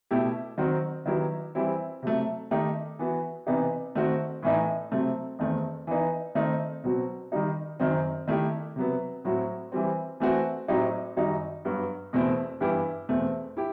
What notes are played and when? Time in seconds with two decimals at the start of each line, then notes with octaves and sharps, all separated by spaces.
0.11 B2 A3 E4 G4
0.58 D#3 F#3 C4 F#4
1.06 D#3 F#3 B3 E4 G4
1.55 E3 G3 C4 E4
2.03 C3 F#3 A3
2.51 D#3 A3 D#4 G4
2.99 E3 B3 F#4
3.46 C3 E3 B3 D#4 G4
3.95 D#3 A3 C4 F#4
4.43 A2 E3 A3 D#4
4.92 C3 F#3 A3 C4
5.39 E2 D#3 A3 C4
5.87 E3 B3 D#4
6.35 D#3 A3 C4 D#4
6.84 B2 F#3 C4 F#4
7.32 D#3 G3 D#4
7.79 F#2 D#3 F#3 C4
8.28 D#3 A3 E4 G4
8.76 C3 F#3 B3
9.25 A2 F#3 C4 F#4
9.72 E3 G3 C4
10.20 E3 A3 C4 F#4
10.68 A2 F#3 C4 D#4 G4
11.17 F#2 D#3 G3 D#4 F#4
11.65 G2 F#3 B3 F#4
12.13 E2 B2 A3 C4 E4
12.61 G2 E3 B3 E4 G4
13.09 E2 B2 A3 C4
13.57 E4 G4